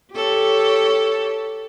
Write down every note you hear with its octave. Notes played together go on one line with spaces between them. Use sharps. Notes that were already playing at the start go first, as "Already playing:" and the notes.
G4 A4 C#5